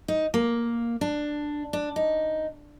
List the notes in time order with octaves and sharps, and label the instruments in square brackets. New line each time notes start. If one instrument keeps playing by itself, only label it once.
[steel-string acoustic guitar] D#4
A#3
D4
D4
D#4